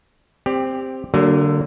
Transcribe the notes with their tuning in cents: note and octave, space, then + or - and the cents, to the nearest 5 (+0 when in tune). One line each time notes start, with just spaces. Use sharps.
C4 +0 G4 +15 D5 -15
D3 +0 F#3 +40 A#3 -25